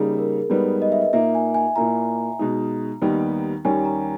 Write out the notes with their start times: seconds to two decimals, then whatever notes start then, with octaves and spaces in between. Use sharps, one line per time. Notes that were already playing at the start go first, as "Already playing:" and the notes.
Already playing: C#3 G3 A#3 D#4 G#4
0.19 A#4
0.50 G#2 G3 B3 D#4 B4
0.82 D#5
0.92 E5
1.02 D#5
1.13 A#2 A#3 D#4 E5
1.35 G#5
1.54 G#5
1.76 A#2 A#3 E4 A#5
2.39 B2 G#3 D#4
3.02 D#2 D#3 G3 B3 D#4
3.65 D#2 D#3 G3 A#3 C#4 G#5
3.85 A#5